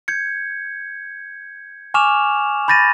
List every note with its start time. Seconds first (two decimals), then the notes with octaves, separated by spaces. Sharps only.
0.08 G6 G#6 C#7
1.94 G#5 C#6 D6 F6 E7 F7
2.68 B5 G6 A6 A#6 D#7